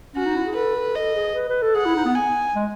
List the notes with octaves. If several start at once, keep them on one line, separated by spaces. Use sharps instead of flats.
C#4 F#4
D#4
E4
G#4
A4 B4
A4
A4 D#5
G#4
B4
B4
A4
G#4 F#5
E4
D#4
B3
G#5
G#3